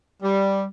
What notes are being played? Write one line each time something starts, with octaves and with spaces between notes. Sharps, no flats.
G3